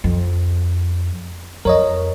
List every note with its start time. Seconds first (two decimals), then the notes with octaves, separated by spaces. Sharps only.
0.04 F2
1.65 F2 A#4 C#5 D#5